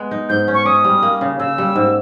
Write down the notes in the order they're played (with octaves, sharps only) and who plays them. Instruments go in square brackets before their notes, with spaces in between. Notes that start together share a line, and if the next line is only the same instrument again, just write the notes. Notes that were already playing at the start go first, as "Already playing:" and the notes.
Already playing: [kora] G#3 B3
D#4
[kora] G#2 [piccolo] G6
[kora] C#4
[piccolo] C#6
[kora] C#4 [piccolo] D#6
[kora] G3
A#3
C#3
[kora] C#3 [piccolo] E6
[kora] G3
G#2